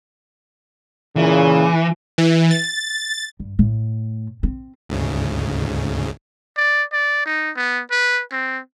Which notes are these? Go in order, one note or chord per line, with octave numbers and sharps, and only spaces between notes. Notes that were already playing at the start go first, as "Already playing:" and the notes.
A#2 C#3 E3
E3
A6
G2
A2
C4
D2 G#2 C#3
D5
D5
D#4
B3
B4
C4